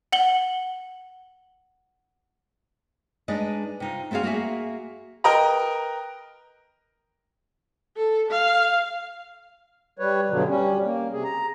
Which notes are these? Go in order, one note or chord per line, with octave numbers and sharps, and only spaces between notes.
F#5 F#7 G7
G#3 D4 D#4 B4 D#5
C3 D#4 F4
A3 C4 F#4 G#4 F5
A#3 F#4 G#4 E5 G#5
A#4 B4 D#5 G5 A#5
A4
F5
G3 B4 C#5
G2 B2 D3 F#3
G3 C#4
A#3
C3 G#4
A#5